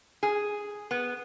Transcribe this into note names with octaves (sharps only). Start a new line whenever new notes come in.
G#4
B3